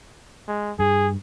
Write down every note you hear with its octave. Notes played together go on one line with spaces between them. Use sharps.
G#3
G2 G#4